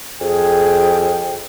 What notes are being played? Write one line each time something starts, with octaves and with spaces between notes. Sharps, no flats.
F2 G#4 G5